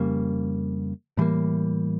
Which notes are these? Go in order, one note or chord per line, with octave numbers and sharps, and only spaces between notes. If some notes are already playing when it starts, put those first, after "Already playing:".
Already playing: F2 C#3 G3 A#3
A2 E3 G3 A#3